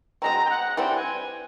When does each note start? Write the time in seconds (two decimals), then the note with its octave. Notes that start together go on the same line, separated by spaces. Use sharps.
0.22 B2 G#3 C4 A#5
0.45 G5
0.50 F#5
0.77 E3 G3 C4 G5
0.96 G#5